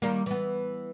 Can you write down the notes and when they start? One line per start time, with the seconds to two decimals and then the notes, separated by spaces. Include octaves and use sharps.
0.02 D#3 G3 A#3
0.26 E3 B3